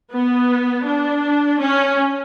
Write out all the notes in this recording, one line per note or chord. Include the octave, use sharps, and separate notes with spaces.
B3
D4
C#4